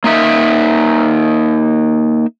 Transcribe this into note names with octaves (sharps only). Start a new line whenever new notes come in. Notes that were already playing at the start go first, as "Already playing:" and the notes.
A#3 D#4 E5